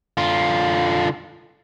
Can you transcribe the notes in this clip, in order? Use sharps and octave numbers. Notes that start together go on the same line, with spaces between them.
D3 F4